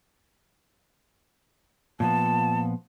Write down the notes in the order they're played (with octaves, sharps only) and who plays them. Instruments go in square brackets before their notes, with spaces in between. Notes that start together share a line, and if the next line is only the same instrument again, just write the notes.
[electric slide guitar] A#2 F3 B3 [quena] A5